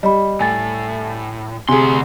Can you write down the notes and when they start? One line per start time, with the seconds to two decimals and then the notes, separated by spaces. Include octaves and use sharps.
0.03 G3 D#5 B5
0.40 A2 G#5 A6
1.69 D2 C3 G#4 G#5 C6